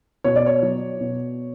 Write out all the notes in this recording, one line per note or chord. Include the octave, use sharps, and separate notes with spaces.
B2 C#5
D5
C#5
F#3
B2